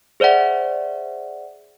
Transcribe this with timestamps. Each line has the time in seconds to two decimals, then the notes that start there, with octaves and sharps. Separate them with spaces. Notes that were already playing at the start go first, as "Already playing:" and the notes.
0.20 G#4 C5 D5 E5 F#5